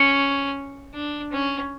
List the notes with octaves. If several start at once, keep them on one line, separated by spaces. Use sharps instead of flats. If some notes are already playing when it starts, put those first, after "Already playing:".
Already playing: C#4 C#7
D4
C#4